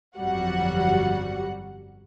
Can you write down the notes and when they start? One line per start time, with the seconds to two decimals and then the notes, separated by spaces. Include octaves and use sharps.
0.18 G1 F2 F#3 G3 F#4 F#5